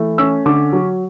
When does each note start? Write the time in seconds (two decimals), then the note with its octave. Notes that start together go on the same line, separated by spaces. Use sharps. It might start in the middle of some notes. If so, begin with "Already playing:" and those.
Already playing: E3 A3
0.18 C#4 E6
0.46 D3 D6
0.73 F#3